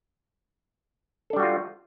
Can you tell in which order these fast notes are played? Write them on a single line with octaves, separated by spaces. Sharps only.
A4 D4 G3 F#4 F4